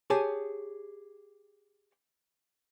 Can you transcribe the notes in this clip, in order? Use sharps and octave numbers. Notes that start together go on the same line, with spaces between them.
G4 G#4 C#5 G#5 A5